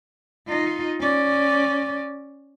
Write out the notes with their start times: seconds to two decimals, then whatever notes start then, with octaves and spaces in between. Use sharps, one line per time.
0.47 D#4 F4
0.99 C#4 D5